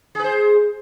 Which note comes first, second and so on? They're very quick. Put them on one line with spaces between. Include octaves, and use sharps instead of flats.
G#4 B4 C5